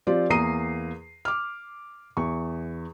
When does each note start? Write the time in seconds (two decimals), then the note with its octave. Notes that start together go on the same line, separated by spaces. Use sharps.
0.07 F3 C4 F4 G4 D5
0.30 E2 A#3 A#5 D#6 C7 D#7
1.25 D6 F6
2.17 E2 C#6